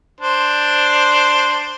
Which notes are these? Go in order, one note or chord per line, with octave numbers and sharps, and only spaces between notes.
D4 C5